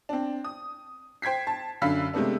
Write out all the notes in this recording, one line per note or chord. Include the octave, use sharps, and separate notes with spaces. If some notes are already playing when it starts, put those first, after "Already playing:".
C4 D4
D#6
C5 G5 G#6 B6 C7
A5
F#2 D3 F5 B5 E6 B6
C3 G#3 A3 B3 D4